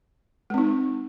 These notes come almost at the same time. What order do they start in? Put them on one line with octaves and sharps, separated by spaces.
G#3 C4 D#4